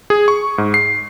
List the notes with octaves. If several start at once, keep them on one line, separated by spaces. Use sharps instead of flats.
G#4
C#6
G#2
C7